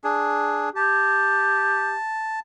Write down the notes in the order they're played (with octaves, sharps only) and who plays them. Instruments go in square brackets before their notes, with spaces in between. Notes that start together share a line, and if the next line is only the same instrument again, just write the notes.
[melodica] D4 G#4
[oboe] G4 [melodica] A5